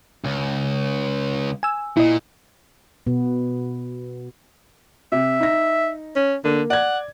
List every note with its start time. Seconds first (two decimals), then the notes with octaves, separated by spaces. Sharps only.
0.24 C#2
1.63 G#5 E6
1.97 A#2 E4 D#5
3.07 B2 B3
5.12 C3 E5
5.40 D#4 A#6
6.16 C#4
6.44 D3 A#3
6.70 D5 F#5 G#6